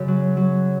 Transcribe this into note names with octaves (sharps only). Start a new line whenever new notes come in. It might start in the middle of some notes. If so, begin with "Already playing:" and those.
Already playing: F#2 C#3
F#3
F#3